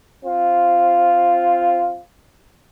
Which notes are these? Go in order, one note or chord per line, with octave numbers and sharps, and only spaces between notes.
C4 F4